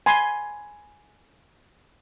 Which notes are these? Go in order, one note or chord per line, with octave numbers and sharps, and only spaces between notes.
G#5 B5 C6